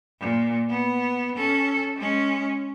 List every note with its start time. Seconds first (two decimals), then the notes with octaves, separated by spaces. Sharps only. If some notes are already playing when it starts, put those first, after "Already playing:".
0.21 A#2
0.69 B3
1.36 C#4 A4
1.97 G#3 C#4